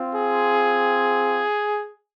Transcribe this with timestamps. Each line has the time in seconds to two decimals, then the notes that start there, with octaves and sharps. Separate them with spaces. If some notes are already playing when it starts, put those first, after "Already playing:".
Already playing: C4 F4
0.14 G#4